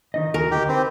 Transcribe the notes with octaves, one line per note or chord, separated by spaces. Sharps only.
D#3 D#4 D#5
D#2 F#4 A#4 G#5
D2 D#4 G4
C4 B4